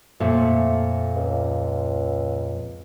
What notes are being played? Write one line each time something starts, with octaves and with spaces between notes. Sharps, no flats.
F2 A#2 A3
C#2